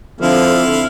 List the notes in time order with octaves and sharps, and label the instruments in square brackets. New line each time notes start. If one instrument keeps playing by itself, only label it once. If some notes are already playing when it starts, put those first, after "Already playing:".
[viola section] D3 [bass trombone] F3 [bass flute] C4 [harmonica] E4 F5